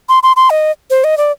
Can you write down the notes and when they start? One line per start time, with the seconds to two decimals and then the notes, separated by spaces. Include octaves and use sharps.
0.09 C6
0.23 C6
0.36 C6
0.50 D#5
0.90 C5
1.04 D#5
1.18 D5